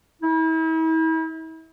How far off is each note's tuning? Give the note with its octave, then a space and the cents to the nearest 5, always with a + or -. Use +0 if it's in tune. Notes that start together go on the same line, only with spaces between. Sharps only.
E4 -40